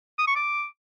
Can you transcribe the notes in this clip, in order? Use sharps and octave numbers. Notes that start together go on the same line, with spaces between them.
D#6
C#6
D6